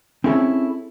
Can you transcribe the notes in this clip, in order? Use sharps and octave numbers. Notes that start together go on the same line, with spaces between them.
C4 C#4 E4 G#4 A4